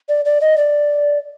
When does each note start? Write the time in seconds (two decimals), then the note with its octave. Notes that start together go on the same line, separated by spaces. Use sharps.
0.09 D5
0.25 D5
0.41 D#5
0.57 D5